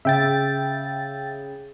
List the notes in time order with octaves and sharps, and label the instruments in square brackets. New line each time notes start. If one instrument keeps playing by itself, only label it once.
[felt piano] C#3 [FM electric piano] E5 G5 A6